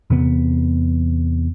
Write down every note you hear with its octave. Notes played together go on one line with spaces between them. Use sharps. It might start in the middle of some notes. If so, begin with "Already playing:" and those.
E2 C3 B3